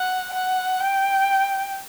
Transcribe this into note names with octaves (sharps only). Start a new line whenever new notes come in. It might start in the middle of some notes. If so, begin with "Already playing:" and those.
Already playing: F#5
F#5
G5